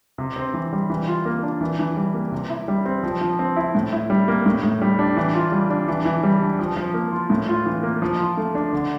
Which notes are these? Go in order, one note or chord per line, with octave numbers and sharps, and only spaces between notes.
C3
C4
E3
G3
E3
F4
A#3
D4
E3
E3
G3
A#3
C3
E4
G3
C4
F3
F3
C4
E4
A2
E4
G3
A#3
A2
A2
G3
D4
E3
F4
G3
D4
E3
E3
G3
D4
F3
F3
A#3
F4
A2
F4
E3
A#3
F3
F4
A3
D4
D3